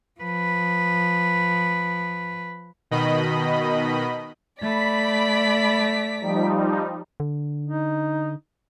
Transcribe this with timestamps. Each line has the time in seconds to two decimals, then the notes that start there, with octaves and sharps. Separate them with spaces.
0.20 F3 B4
2.91 B2 D#3 D#5 B5
4.62 A3 D5 B5 B6
6.21 F3 G3 D#4
7.20 D3
7.65 D#4